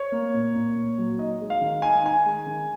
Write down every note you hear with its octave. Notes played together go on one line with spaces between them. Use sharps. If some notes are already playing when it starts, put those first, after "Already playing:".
Already playing: C#5
A#3
A#2
A#2
A#2
F#3
D#4 D#5
G#3
F5
D#3
D#4 G#5
D#4 G#5
G#3
D#3